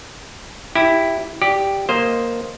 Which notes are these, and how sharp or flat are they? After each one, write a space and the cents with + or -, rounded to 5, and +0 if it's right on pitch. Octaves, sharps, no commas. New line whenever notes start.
E4 +0 G4 +0
G4 +0 D5 +0
A#3 +0 C5 +0 D#5 +0